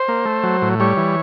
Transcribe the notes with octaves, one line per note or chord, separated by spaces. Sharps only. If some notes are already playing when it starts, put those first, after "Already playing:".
Already playing: C5
A#3
A3
F#3
A2
G3 C#5
E3